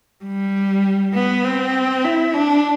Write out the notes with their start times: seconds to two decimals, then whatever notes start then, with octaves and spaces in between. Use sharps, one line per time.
0.25 G3
1.14 B3
1.44 C4
2.04 E4
2.34 D4